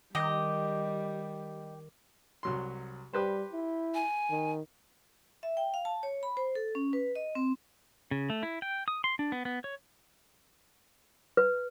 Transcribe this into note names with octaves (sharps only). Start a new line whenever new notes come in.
D#3 G3 G4 D#5
C2 F#3 C6
G3 G4 B4 C5
E4
G#5
D#3
E5
G5
F5
A5
C#5
B5
C5
A4
C#4
B4
D#5
C4
C#3
A3
E4
G5
D#6
C6
D4
B3
B3
C#5
B4